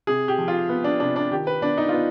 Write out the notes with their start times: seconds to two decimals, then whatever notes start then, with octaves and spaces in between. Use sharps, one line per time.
0.07 C3 G#4
0.28 G4
0.38 F3
0.48 F4
0.69 B3
0.84 D4
1.00 C3 D4
1.16 D4
1.31 D#3 G4
1.47 B4
1.62 B3 D4
1.77 D#4
1.89 B3 F4